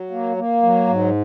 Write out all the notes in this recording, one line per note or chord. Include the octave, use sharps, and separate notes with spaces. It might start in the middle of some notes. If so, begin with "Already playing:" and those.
Already playing: F#3
A#3
A#3
F#3
G#2